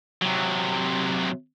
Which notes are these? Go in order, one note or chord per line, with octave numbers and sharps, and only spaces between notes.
C3 F#3